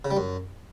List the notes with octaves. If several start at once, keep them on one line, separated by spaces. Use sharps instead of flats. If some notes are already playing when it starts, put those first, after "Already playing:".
C#3
G3
F#2